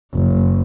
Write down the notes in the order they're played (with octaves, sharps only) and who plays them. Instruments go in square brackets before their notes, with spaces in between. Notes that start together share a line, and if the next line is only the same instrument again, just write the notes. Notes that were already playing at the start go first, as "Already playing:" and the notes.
[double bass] F#1